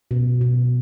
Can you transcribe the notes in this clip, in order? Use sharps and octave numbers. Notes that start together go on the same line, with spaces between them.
B2
B2